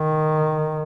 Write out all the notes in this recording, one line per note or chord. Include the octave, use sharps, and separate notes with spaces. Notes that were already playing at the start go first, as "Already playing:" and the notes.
Already playing: D#3